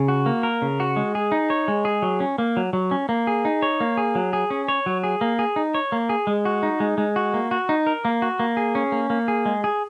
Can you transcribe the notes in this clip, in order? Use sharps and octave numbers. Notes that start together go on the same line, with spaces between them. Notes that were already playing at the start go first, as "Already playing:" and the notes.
Already playing: C#3
F#4
A#3
A#4
C#3
F#4
G#3
G#4
D#4
C#5
G#3
G#4
F#3
C#4
A#3
F#3
F#3
C#4
A#3
G#4
D#4
C#5
A#3
G#4
F#3
G#4
C#4
C#5
F#3
G#4
A#3
G#4
D#4
C#5
A#3
G#4
G#3
F#4
D#4
G#3
G#3
F#4
A#3
F#4
D#4
A#4
A#3
F#4
A#3
G#4
C#4
A#3
A#3
G#4
G#3
G#4